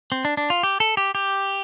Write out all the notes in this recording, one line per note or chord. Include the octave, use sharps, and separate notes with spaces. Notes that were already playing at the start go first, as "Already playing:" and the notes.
C4
D4
D4
F4
G4
A4
G4
G4